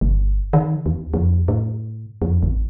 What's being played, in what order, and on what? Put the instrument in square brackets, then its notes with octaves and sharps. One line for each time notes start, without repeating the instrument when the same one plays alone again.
[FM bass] G1
D#3
E2
F2
A2
F2
A1